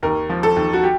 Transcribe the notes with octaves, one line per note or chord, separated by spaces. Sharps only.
D#2 A#4
F3
A4
D#2
F#4
G4